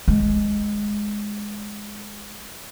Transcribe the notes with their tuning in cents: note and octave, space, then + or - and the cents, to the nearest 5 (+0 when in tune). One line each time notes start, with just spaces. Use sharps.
G#3 +0